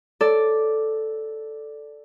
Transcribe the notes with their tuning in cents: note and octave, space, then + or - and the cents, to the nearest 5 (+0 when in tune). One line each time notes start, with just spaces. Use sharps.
A4 +0 D5 +0